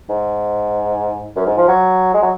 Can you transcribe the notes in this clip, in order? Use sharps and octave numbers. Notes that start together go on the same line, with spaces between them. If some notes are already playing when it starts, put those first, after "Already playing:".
G#2
F#2
G#2
F3
F#3
G#3
F#3